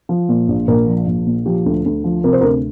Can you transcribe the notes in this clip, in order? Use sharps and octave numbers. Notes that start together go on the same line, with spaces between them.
F3
A#2
A#1
A#1 A#4
F3
A#1
A#2
F3 G4
D2
D2
F3
C3 A#4
C5
A#4
D2